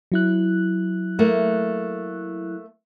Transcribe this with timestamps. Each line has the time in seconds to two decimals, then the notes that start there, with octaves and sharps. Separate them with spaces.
0.12 F#3 E4 F#6
1.19 A3 A#3